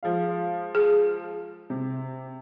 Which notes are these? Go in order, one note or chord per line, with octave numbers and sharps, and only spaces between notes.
F3 G#3 F5
G#4
C3